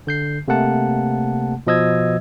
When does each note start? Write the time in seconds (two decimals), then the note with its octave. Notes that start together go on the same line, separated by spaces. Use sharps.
0.07 D3 G6 C7
0.48 C3 A3 A#3 F#5 A5
1.67 B2 F3 D#5 E6 G#6